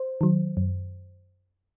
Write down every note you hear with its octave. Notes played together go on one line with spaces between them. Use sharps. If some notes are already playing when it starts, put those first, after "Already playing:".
Already playing: C5
D#3 F#3
F#2